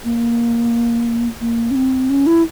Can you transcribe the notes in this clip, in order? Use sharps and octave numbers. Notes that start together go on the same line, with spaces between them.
A#3
A#3
C#4
C4
C#4
E4